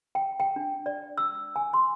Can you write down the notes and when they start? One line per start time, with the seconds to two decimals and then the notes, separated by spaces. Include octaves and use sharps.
0.15 G5
0.40 G5
0.56 D4
0.86 D5
1.18 E6
1.56 G#5
1.73 C6